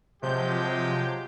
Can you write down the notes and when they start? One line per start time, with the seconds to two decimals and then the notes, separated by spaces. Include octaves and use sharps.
0.23 C3 F3 F#3 G#3 G4 G6